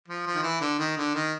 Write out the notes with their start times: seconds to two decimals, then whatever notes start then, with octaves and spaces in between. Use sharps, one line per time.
0.08 F3
0.26 F3
0.35 D#3
0.43 E3
0.61 D3
0.79 D#3
0.97 D3
1.14 D#3